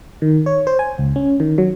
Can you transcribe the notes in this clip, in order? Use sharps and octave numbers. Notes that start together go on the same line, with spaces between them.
D#3
C#5
C5
G#5
C#2
C#4
D#3
F#3